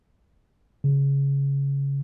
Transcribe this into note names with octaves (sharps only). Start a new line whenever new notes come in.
C#3